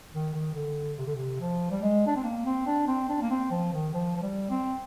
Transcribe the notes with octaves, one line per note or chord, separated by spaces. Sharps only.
D#3
D#3
D3
C3
D3
C3
F3
G3
G#3
D4
C4
A#3
C4
D4
C4
D4
A#3
C4
F3
D#3
F3
F3
G3
C4